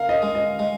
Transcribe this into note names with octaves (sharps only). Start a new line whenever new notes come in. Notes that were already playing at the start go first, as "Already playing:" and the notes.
Already playing: A#4 F5
D#5
G#3
D#5
G#3